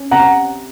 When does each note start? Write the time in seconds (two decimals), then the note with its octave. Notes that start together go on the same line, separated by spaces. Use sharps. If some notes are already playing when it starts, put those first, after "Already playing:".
Already playing: C#4
0.11 C3 F#5 A#5